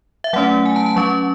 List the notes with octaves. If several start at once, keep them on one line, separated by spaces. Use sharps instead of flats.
E5
F#3 A3 C#4 F#5
G#5
A5
A5
F#3 C#4 C#6